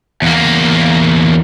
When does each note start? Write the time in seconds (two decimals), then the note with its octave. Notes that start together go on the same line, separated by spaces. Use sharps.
0.22 E2 A#3